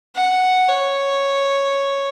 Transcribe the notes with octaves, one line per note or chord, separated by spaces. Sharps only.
F#5
C#5